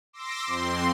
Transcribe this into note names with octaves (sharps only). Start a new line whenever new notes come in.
C6 D6 E6 A#6
F2 C4 C6